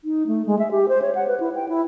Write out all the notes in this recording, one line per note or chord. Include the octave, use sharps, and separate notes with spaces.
D#4
A3
G#3
E5
G4
C5
C#5
F#5
B4
E4
G5
E4